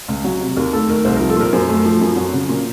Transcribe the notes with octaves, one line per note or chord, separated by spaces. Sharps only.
C#2
F#3
C3
D#2 A#4
A3 A4
D#3 A#4
C2 C5
F3 A#4
A4
A#2 A#4
F#2 C5
A3
F3
F#2
F#3
C#3
A#2